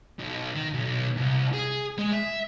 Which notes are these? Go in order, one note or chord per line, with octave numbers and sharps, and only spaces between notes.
B1
D#3
B1
C2
G#4
G#3
E5